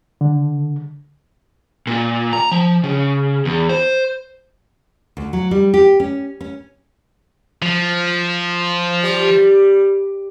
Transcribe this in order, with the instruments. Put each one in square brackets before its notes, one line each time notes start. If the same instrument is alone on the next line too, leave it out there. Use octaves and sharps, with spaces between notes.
[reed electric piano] D3
[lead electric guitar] A#2
A#5
F3
C#3
E2
C5
[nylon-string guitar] D2
F#3
G3
G4
C#4
C#4
[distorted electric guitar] F3
[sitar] G3